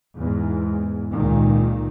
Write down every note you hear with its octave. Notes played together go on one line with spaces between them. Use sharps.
E2 G#2
C#2 A#2 D#3